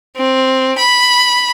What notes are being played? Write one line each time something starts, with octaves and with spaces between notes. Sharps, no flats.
C4
B5